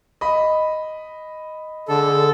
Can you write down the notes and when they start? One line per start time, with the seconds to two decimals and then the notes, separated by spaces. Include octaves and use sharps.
0.21 D#5 B5
1.88 D3 G#4 A4